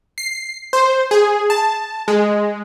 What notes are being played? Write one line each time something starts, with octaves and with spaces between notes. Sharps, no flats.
C7
C5
G#4
A5
G#3